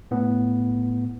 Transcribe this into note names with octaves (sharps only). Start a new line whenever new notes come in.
A2 B3